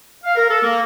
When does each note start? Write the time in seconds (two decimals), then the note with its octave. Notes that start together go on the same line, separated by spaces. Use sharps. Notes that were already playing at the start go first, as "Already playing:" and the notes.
0.24 F5
0.36 A#4
0.49 A4
0.63 A#3